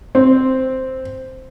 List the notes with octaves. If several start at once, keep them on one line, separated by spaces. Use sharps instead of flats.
C4